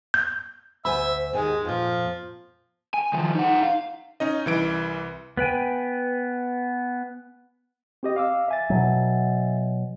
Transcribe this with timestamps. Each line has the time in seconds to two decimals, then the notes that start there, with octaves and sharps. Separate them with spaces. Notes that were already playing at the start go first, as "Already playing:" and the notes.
0.14 G6
0.85 D2 C5 E5 G#5 B5
1.33 D#2 D#3 G#3 G#5
1.65 F2 A#2 F3
2.94 G#5
3.13 D#3 F3
3.35 D#4 F#5
3.63 F5
4.20 C#4 D#4 D#5
4.46 C2 E3 D7
5.37 B3 B4 G5 G#5
8.03 C4 G4 D#5
8.16 F5 D6 E6
8.48 E5 G#5 A6
8.70 B2 F#3